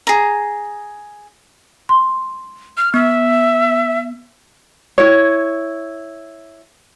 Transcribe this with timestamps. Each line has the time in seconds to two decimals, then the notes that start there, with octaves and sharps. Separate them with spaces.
0.07 G#4 A#5
1.89 C6
2.77 F6
2.94 B3 E5
4.98 E4 C#5